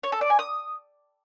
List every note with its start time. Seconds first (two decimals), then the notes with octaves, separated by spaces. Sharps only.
0.03 C#5
0.12 A4
0.21 D5
0.30 G#5
0.39 D#6